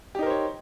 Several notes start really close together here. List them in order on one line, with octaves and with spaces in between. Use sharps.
G4 D#4 A#4 C5 C#5